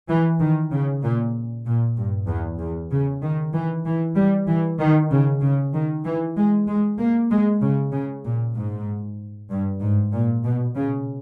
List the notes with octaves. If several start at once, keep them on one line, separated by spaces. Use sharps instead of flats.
E3
D#3
C#3
A#2
A#2
G2
E2
E2
C#3
D#3
E3
E3
G3
E3
D#3
C#3
C#3
D#3
E3
G#3
G#3
A#3
G#3
C#3
C#3
A#2
G#2
G2
G#2
A#2
B2
C#3